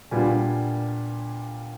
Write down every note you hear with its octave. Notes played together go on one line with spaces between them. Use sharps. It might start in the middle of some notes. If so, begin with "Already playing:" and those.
A#2 G3 B3 D4 F4 G#5